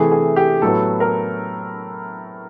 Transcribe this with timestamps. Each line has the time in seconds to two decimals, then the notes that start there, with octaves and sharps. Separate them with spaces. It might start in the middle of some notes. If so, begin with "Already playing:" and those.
Already playing: C3 E3 A3 G#4
0.11 G#4
0.36 G4
0.62 A2 F#3 B3 A4
1.00 A#4